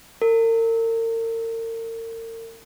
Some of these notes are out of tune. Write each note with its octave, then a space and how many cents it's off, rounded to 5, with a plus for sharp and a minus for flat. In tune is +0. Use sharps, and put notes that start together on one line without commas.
A#4 -40